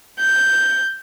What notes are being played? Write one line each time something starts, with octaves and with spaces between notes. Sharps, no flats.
G6